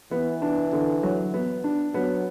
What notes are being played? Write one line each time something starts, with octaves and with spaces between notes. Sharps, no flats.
E3 B3
D4
D3
F#3
B3
D4
F#3 B3